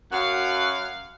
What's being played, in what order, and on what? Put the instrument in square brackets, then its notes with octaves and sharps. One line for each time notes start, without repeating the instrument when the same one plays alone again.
[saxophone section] F#2 F#5 [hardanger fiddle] F5